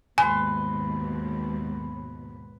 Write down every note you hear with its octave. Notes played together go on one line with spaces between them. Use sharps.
D#2 G#2 B2 B4 G#5 C6